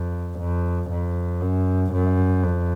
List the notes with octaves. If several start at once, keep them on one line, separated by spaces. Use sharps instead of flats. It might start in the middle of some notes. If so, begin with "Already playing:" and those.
Already playing: F2
F2
F2
F#2
F#2
F2